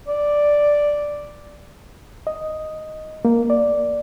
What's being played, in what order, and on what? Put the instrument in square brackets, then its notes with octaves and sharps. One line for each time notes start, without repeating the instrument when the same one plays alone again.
[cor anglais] D5
[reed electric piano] D#5
A#3
D5